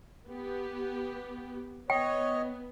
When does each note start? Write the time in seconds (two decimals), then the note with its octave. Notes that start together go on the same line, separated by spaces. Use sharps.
0.27 B3 G4
1.90 B3 C#5 D#5 G5